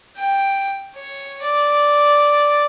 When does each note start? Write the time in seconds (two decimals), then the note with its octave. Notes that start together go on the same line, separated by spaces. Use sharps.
0.17 G5
0.95 C#5
1.43 D5